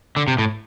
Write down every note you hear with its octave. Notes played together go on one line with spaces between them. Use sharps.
D3
C3
A2